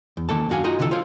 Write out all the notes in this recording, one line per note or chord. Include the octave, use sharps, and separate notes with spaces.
E2
D#3 A#3 A4 A5
F#2 D3 F#4 F5 G#5
D#4 F4 F#4 D#5 A#5
C2 D3 E3 A3 A4
F4 C5 C#5 F5